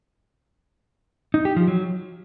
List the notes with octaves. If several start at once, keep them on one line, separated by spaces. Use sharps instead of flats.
D#4
G4
F3
F#3